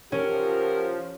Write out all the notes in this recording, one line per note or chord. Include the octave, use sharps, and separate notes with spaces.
F3 F#3 C#4 G4 A4 A#4